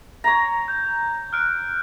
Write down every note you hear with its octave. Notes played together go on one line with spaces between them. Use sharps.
C#5 A#5
G6
F6 F#6 D7